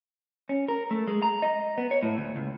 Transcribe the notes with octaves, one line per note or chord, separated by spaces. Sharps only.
C#4
A#4
A3
G#3
A#5
D#5
B3
C#5
A2
D2
C#2